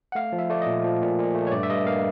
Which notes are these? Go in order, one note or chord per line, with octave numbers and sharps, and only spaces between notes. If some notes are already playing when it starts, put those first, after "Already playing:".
F#5
A3 F5
F3
E5
A3 D5
A#2 D#5
F3
A#2
A#2
A3
C#5
G2 D5
E5
G2 D#5
A#3 F5